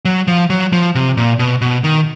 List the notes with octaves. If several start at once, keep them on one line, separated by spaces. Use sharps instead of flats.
F#3
F3
F#3
F3
C3
A#2
B2
B2
D#3